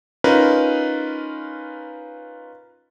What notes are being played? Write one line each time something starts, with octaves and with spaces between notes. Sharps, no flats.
C#4 D#4 F4 A#4 B4